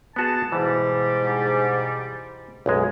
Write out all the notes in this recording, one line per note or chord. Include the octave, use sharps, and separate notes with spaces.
B3 F#4 G#4 A5
G#2 B2 E3 G3
B1 F#2 G#3